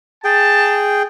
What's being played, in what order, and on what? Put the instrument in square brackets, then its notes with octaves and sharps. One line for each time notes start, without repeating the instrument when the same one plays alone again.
[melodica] G#4 G5 [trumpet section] A5